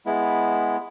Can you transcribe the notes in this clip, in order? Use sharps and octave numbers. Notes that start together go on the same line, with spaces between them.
G#3 B3 E4